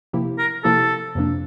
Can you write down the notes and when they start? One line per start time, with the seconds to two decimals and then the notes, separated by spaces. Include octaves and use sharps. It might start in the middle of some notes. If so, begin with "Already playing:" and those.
0.13 C3 F3 A#3 E4 G4
0.38 A#4
0.64 C3 F3 A#3 E4 G4 A4
1.15 F2 C3 F3 A#3 D4